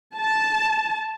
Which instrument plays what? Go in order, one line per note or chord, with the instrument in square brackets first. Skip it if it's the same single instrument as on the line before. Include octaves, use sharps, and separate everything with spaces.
[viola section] A5